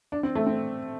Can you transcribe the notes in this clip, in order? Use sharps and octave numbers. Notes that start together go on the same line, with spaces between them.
D4
C4
A3
C4